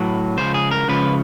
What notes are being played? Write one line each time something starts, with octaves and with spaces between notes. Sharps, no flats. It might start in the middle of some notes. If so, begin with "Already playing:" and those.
Already playing: A2 F#3 B4
C#2 C#3 F3 C5
G#4
A#4
C#2 C#3 F3 B4